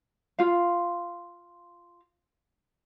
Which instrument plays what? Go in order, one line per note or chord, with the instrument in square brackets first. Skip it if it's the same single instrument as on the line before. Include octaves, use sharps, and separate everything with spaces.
[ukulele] F4 F5